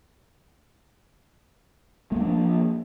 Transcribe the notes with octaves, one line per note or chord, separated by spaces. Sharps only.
F3 A3 A#3 D4